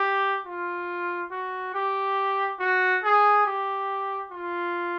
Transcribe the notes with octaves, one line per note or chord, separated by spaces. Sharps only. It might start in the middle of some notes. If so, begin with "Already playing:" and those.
Already playing: G4
F4
F#4
G4
F#4
G#4
G4
F4